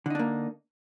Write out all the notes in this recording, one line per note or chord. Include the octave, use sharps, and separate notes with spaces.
D3 A#3 D4 D#4